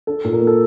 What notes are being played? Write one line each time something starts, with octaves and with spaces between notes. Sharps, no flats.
D4 A4
A#2
A#4
A#3
A4